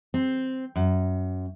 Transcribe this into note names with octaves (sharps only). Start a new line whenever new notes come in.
C4
F#2